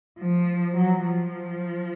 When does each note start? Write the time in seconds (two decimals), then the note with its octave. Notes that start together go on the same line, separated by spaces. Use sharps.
0.19 F3
0.77 F#3
1.04 F3